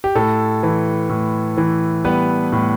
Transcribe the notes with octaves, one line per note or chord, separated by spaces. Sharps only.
G4
A2 A4
E3
A2
E3
G3 B3 B4
A2